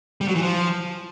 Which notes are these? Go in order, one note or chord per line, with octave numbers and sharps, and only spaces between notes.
G3
F#3
E3
F3